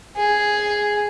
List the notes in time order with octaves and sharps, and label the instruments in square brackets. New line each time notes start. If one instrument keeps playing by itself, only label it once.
[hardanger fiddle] G#4